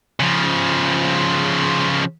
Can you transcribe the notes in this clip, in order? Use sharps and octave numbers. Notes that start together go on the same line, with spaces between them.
C#3 F3